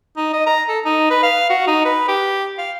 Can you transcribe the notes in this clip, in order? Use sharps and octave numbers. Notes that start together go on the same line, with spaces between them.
D#4
D#5
A#5
A4
D#4
B4
F5
F#4
D#4
B4
G4
F5